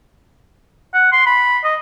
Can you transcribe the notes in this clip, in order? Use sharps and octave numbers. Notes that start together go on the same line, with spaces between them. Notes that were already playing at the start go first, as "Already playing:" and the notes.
F#5
C6
B5
D#5